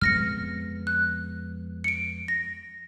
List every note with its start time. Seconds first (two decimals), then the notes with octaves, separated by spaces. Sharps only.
0.02 F2 G#3 B3 F6 A#6 C#7
0.87 F#6
1.84 C#7 D7
2.28 A#6